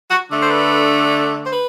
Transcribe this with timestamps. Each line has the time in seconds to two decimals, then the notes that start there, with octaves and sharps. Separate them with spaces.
0.10 F#4
0.30 D3 A3 D4
0.41 C5
0.50 B4
1.44 C5
1.51 B4